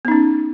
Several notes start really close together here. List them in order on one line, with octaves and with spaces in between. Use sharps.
B3 D#4 C#4